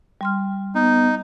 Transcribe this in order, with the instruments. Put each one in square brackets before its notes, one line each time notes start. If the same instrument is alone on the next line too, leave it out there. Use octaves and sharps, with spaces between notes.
[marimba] G3 C6 F6
[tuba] B3 [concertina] D#4